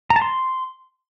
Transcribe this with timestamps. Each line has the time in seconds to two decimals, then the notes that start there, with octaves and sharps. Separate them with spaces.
0.10 A#5
0.16 A5
0.22 C6